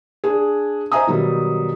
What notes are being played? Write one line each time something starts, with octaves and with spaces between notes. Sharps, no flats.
D4 G#4
C5 D#5 E5 G#5 A#5 D#6
B2 D#3 F#3 G3